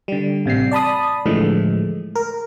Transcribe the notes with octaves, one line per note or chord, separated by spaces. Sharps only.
D3 G3
A1 C3 G3 C7
D5 A5 B5 D#6
A2 D3 E3 F3 G#3 A3
A#4